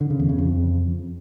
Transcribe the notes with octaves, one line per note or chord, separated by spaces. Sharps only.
D3
C#3
E2
C#3
F2